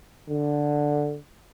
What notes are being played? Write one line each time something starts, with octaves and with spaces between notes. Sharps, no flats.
D3